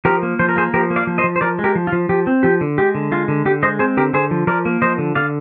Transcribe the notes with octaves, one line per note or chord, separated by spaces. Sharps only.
F3 G4 A#4
A#3
F3 C5
A#4
A#3 G#4 C5
F3 G4 A#4
A#3
D5 F5
F3
C5 D#5
F3
C5
F3 A#4 D5
G#3
G4 A#4
F3
F4
F3
F3 G4
C4
F3 G4
D3
G#3 G4
D3
G#3 F4
D3
D3 G4
G#3 C5 D#5
C4 G#4 C5
D3 G4 A#4
D3 G#4 C5
F3
F3 A#4 D5
A#3
F3 C5 D#5
D3
D3 D5 F5